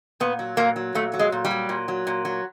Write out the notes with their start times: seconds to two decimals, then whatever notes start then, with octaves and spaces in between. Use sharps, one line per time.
0.20 A#2 B3
0.39 F#3
0.57 A#2 A#3
0.76 F#3
0.95 A#2 A3
1.14 F#3
1.19 G#3
1.32 A#2
1.45 G3
1.51 F#3
1.69 A#2
1.88 F#3
2.07 A#2
2.25 F#3